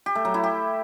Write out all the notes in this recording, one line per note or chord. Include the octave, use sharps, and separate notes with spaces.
G4
A3
F#3
E4
G4